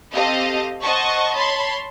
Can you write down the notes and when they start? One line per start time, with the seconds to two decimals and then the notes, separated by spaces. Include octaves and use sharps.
0.14 C4 G4 A4 D#5 F5
0.82 C5 D#5 F#5 A5 C#6
1.35 C#5 A5 B5 C6